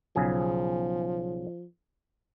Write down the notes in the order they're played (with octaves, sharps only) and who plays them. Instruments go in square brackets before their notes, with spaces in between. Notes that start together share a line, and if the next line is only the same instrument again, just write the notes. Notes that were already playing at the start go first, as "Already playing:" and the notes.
[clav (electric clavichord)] B1 C#3 G#4 [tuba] F3